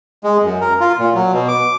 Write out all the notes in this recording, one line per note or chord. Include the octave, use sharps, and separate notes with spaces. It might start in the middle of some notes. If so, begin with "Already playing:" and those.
G#3
F#2
A#4
F4
A#2
F#3
B2
D6